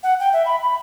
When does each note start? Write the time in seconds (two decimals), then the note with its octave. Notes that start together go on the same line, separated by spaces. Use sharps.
0.03 F#5
0.20 G5
0.33 E5
0.46 B5
0.62 B5